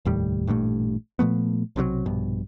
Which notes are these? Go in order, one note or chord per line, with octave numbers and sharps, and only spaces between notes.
F1 D#2 A2 G3
A1 G2 A#2 A3
A#2 F3 A3 B3
B1 C3 D#3 F#3
A#1 G2 B2